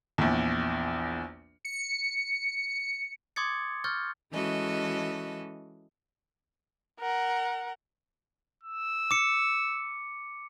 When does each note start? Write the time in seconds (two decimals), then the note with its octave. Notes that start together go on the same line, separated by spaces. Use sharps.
0.18 A#1 E2
1.65 C#7
3.36 C6 D6 D#6 G#6 A6 C#7
3.84 C#6 F6 G6 A6
4.33 E3 G#3 C#4 F#4 A4 D#5
7.00 A#4 F#5
8.64 E6
9.11 D6 C#7